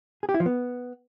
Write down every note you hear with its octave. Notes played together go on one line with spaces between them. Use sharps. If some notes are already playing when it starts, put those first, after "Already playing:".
G#4
G4
E4
F3
B3